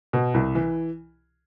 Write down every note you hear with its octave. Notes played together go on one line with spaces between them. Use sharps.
B2
C2
E3